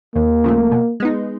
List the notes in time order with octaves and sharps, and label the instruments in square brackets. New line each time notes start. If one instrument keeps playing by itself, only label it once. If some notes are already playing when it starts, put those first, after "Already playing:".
[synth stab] D#2 [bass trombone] A#3
[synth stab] C#3 F3 A3
B2
G#3 B3 D#4